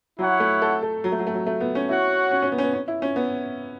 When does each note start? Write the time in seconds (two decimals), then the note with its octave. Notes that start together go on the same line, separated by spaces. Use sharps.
0.19 F#3 E4 C#5 F#5
0.40 A3
0.62 A4
0.83 A4
1.04 F#3
1.12 A3
1.19 F#3
1.27 A3
1.34 F#3
1.46 A3
1.60 B3
1.75 C#4
1.89 E4 F#4 C#5 F#5
2.31 C#4
2.42 C#4
2.52 B3
2.58 C#4
2.63 B3
2.73 C#4
2.88 E4
3.02 C#4
3.16 B3